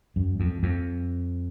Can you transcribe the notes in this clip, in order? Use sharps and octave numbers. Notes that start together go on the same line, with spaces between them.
F#2
F2
F2